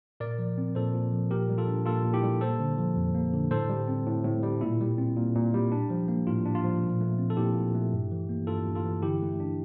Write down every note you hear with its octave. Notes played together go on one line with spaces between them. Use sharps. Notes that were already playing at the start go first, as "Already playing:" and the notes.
A#2 A#4 D5
F3
C4
A#2 A4 C5
A#2
F3
A#2 G4 A#4
G3
F4 A4
D4
A#2 F4 A4
A#2
E4 G4
G3
A#3 A4 C5
D3
F3
F2
A#3
D3
A2 A4 C5
G3
C4
A2
A2
G3
A#2 E4
G3
C4
A#2
A#2
G3
D4
F3
A#3
A2 F4
D4
F4
F3
A#2
A3
C4
A4
A#2 E4 G4
A#2
A3
G2
E3
A#3
G2 F4 A4
G2
F4 A4
E3
D3 E4 G4
A3
D4